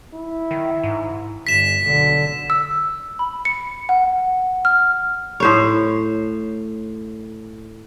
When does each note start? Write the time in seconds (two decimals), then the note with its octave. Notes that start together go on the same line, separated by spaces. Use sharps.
0.14 E4
0.51 D#3
0.83 G#2
1.47 G1 B6 E7
1.84 B1 D3
2.50 E6
3.19 B5
3.45 C#7
3.89 F#5
4.65 F6
5.40 A2 C5 C#5